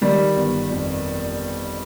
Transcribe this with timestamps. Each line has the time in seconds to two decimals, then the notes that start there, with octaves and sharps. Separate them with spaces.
0.01 D#3 G3
0.36 G1
0.71 F2